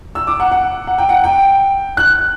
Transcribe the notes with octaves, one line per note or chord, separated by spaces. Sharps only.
E6
D6
F#5
F#5
F#5
G5
F#5
G5
F#6